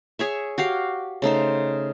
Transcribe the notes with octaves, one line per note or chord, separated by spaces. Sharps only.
G#4 C#5 E5
F#4 G4 F5
C#3 A3 D#4 C5